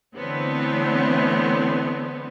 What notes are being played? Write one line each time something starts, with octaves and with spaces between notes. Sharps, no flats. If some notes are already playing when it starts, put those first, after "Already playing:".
D3 E3 A3 B3 C4 C#5